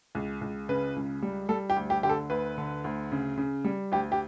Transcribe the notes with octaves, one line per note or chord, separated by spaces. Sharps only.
C#2
C#2
C#3 B4
C#2
G3
G3 A4
G4
D2
G4
D3 G4
A4
D2 B4
D3
D2
C#3
C#3
G3
D2 G4
G4